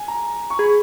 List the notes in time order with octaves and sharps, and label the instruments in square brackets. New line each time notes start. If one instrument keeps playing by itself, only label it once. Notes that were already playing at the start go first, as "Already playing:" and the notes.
Already playing: [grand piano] G#5
A#5
C#6
[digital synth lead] G#4 [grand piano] B5